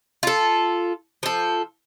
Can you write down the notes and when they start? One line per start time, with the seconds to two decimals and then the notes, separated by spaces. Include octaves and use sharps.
0.23 F4 A4
1.23 F3 A4